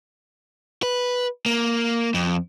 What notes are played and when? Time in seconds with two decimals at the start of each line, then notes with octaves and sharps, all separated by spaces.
0.83 B4
1.46 A#3
2.14 F2